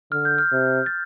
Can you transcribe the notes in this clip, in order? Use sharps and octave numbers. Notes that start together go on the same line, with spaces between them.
D3 F6
G6
F6
C3
A6